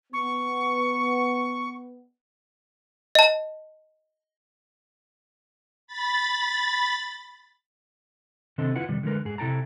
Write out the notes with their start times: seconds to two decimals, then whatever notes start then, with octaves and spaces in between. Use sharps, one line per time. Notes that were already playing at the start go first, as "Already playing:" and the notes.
0.13 B3 C#6
3.15 D#5 A5
5.87 B5 A6
8.58 C3 D#3 C4 D4 A4 D#5
8.76 E4 F4 B4 F#5
8.89 C3 D#3 G3
9.03 D3 E3 G#3 D#4 A#4 B4
9.25 G#2 G#4
9.38 C3 E4 A4 G5 A5 A#5